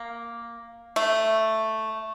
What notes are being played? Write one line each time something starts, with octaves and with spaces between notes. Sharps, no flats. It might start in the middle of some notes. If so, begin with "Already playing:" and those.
Already playing: A#3
A3